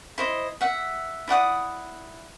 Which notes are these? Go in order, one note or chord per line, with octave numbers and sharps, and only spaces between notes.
E4 C5 D#5
E5 F#5
E4 D5 F#5 D#6